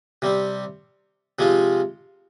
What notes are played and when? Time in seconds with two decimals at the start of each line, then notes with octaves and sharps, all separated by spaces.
0.22 C3 G3 C4
1.39 C3 F3 G#3 C4 F4